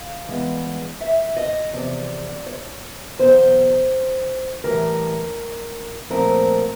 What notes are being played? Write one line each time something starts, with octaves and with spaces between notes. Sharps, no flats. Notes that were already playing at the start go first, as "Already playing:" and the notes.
Already playing: F5
G2 E3 G#3 B3
E5
D#5
E2 C3 F3 D5
C#5
E2 B2 F#3 C5
A2 E3 G3 A#4
A#2 F3 A3 C4 A#4